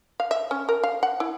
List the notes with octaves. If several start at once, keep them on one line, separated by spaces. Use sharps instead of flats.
F5
E5
C#4
A#4
F5
F#5
E4